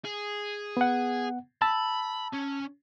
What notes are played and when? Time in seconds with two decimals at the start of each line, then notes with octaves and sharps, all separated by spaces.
0.05 G#4
0.77 B3 F#5
1.62 A5 B5 E6
2.34 C#4